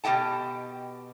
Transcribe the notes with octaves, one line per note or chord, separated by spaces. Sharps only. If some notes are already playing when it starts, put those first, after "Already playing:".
B2 G4 D#5 G5 A5